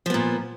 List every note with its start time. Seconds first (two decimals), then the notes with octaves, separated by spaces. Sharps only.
0.06 F3
0.10 B3
0.14 A#2